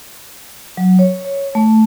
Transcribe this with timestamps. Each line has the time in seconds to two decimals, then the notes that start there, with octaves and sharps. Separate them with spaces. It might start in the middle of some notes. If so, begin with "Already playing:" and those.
0.77 F#3
0.99 C#5
1.25 C#5
1.55 A3